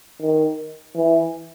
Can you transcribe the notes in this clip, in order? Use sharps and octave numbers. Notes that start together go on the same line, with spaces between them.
D#3
E3